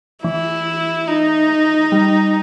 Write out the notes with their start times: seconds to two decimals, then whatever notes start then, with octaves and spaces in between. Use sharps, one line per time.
0.24 E3 E4
1.08 D#4
1.92 G3